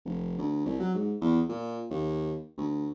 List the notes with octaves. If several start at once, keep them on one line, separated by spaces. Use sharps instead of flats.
F1
D2
C2
F#3
G#2
E2
A#2
D#2
D2